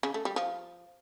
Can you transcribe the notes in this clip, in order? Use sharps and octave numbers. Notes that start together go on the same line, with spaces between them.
C#3
A3
G3
F3